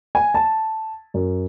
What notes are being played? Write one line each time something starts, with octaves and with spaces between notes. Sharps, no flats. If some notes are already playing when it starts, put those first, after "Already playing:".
G#5
A5
F#2